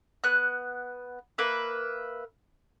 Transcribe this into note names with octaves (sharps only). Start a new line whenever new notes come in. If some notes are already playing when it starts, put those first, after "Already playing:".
B3 F#6
A#3 B4 E5